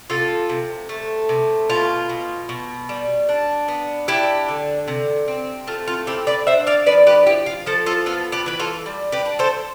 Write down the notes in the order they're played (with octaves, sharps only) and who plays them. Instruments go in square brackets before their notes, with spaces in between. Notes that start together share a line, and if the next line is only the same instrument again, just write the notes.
[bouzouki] C3 F4 A4
C3
A3
C3
B2 F4
B2
B2
G3
D4
B3
D4 E4 G4
D3
C3
C4
A3 F4
F4
C4 E4 G4
B4 D5
D4 C5 E5
D5 F5
F3 B4 D5
G4 B4
F3 E4 G4
F4
F3 A4 C5
F4 A4
B3 F4 A4
G4 B4
E3 B4
F4 A4
G3
G4 B4
D4
A4 C5